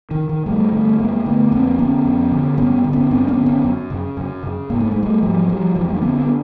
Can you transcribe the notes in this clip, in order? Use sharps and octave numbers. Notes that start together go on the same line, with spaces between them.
D#3
D#3
G2 G3 A3
D3 G3 A3
G2 G#3 A#3
D3 A3 B3
F2 A#3 C4
D3 B3 C#4
F2
D3
G2 B3 C#4
D3
B3 C#4
G2 C4 D4
B3 C#4
D3
B3 C#4
F#2
C#3
F#2
C#3
G#2 A#3
A3
G#3
G3 A3
G#2 F3 G3
F3 G3
F2 E3 F#3
G3 A3
D4
D3 B3 C#4
C4 D4
B3